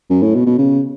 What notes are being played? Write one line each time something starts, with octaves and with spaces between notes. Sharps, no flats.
F#2
A2
B2
B2
C#3